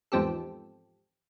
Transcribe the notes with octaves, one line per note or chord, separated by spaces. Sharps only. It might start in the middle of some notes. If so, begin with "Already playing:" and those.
E2 G#2 F3 C4 G4 A4